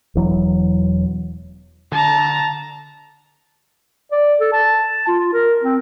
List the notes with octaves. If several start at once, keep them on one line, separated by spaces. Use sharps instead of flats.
E1 E3 F#3
D3 A5 A#5
D5
A4
A5
F4
A#4
C4